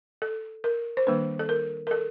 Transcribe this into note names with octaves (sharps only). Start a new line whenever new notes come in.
A4
A#4
C5
D#3 G3 A#3 D4 B4
A4
A#4
A#4
A4